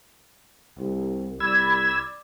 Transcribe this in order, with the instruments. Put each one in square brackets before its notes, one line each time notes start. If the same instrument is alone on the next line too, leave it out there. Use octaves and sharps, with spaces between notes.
[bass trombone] C2
[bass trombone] C2 [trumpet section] D5 [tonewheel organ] B5 E6 G#6